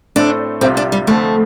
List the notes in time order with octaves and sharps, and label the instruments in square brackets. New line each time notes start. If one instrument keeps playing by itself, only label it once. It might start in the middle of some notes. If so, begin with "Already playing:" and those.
[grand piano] A2 A3 C4 A4 [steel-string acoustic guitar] D4
[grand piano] C2 C3 G3 F4 [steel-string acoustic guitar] C4
[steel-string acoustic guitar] D4
G3
[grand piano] F2 D3 F3 C4 [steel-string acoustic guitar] A3